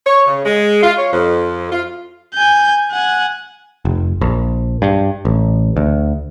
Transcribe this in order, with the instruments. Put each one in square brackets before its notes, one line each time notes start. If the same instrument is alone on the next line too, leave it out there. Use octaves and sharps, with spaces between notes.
[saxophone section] C#5
C#3
G#3
F4
C#5
F2
F4
[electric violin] G#5 G6
F#5 G#5
[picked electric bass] F1
A#1
G2
A1
D2